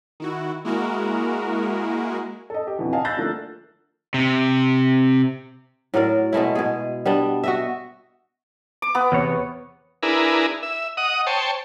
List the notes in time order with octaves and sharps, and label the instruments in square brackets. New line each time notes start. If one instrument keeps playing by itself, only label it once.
[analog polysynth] D#3 E4 F#4
G#3 A#3 E4 F#4 G#4 A#4
[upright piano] A4 D#5
G4
F2 B2 D3 E3
D#5 F5 G#5 A5
E6 F#6 G6 A6 A#6 C7
D3 F3 A3 A#3 A#4
[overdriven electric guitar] C3
[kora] A2 F#3 A#4 D5
B2 G#3 A3 E4
B2 G#4
G3 B3 D4
F#4 D#5 E5
[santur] D6
B3 B4
[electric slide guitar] E2 C3 C#5
[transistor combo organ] D4 E4 G#4 A#4 B4
E5
D#5 F#5 D#6
C5 C#5 G5 A5